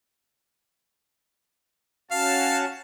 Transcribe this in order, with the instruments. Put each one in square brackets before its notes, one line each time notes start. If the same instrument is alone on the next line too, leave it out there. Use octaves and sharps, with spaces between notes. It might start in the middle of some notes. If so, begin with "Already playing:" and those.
[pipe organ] C#4 F#4 A5 [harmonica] F5